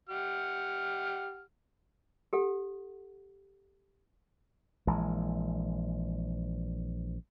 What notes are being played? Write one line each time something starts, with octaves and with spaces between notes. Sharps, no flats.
G4 F#5 F6
G4 A4 F#5
A#1 E3 G#3